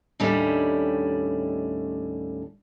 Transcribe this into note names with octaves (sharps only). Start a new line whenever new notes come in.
D#2 A2 G3 A3 C#4 D4